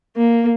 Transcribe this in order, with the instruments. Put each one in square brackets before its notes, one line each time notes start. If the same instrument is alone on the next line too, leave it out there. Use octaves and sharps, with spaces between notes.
[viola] A#3